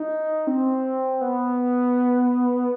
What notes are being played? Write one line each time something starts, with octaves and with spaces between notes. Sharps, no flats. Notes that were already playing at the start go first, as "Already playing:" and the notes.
Already playing: D#4
C4
B3